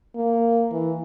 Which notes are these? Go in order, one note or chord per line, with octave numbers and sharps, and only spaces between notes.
A#3
E3